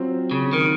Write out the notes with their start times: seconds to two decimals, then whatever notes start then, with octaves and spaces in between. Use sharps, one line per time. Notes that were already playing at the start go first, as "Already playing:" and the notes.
Already playing: F#3 C4 F4 C5
0.31 C#3
0.53 D#3